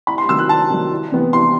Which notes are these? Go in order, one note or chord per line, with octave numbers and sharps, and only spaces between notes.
C2 B5
C6
C3 D#3 F#3 E6
F#6
C2 A5
C3 D#3 F#3
C2
C3 E3 B3
C2 C6